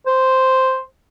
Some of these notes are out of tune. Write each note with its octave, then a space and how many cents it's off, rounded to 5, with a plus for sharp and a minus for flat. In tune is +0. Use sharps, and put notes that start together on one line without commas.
C5 -5